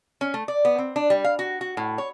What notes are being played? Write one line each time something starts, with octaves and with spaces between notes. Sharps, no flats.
C#4
A3
D5
B3
C4
D4
G3
F5
F#4
F#4
A2
C#5